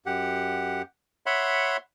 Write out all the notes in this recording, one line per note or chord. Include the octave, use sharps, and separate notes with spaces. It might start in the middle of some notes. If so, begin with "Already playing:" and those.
F#2 G4 F#5
C#5 E5 F#5 B5 C6